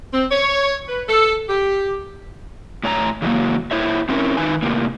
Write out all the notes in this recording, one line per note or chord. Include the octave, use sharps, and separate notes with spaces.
C4
C#5
B4
A4
G4
A2 C#5 A5 A#5
C#3 E3 F#3 A#3
A#2 C4 E4 C5 C#5 E5
C4 C#4 E4 A#4
D#3 D#4 B4 G#5
A2 C3 A#3